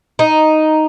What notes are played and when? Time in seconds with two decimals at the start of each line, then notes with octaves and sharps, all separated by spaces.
0.19 D#4